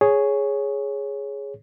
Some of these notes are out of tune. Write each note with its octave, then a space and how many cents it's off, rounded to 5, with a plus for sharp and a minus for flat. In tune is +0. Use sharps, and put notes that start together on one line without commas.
G#4 +0 C#5 +0